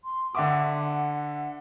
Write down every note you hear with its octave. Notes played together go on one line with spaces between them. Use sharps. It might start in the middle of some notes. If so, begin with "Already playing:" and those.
C6
D3 E5 F#5 D6